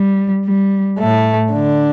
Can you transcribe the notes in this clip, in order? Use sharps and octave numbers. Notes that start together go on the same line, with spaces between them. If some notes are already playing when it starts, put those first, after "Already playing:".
Already playing: G3
G3
A2 A3
D3 D4